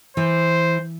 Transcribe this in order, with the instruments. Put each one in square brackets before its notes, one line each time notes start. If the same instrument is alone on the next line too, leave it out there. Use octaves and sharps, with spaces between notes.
[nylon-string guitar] E3 [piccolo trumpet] C5